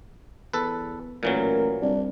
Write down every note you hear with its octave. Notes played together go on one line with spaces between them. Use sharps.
E2 A4 B4
A1 A#2 E3 F#3 A#4
C2 D4